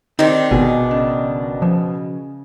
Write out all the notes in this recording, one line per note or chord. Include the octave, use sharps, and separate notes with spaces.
D#3 C4 D4 D#4 G4 C5
G#1 B2 G#4
C#3
C#3 F3